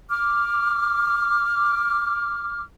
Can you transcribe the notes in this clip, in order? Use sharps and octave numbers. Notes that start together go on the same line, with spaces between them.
D6 F6